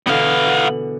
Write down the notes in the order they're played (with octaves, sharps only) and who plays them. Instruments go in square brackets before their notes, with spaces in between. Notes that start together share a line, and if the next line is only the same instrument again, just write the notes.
[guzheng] B2 D3 E3 [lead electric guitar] B3 F5